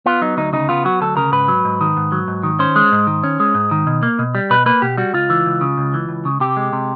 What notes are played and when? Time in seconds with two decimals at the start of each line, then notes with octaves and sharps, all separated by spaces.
0.06 B3 F4
0.21 F#3 D#4
0.37 D2 D#4
0.53 C#3 D#4
0.69 B3 F4
0.85 F#3 F#4
1.01 D2 A4
1.17 C#3 A#4
1.32 G#2 B4
1.48 F#3
1.65 G#2
1.81 D#3
1.97 G#2
2.12 F#3
2.28 G#2
2.43 D#3
2.59 C#4 C5
2.76 G#3
2.92 G#2
3.07 D#3
3.24 C#4
3.40 G#3
3.55 G#2
3.71 D#3
3.87 B2
4.03 A#3
4.19 B2
4.35 G3
4.50 B2 B4
4.66 A#3 B4
4.82 B2 G4
4.97 G3 F#4
5.14 C#2 F4
5.30 E3
5.46 C#2
5.61 C#3
5.78 C#2
5.94 E3
6.09 C#2
6.25 C#3
6.40 C3 G4
6.57 G#3
6.73 C3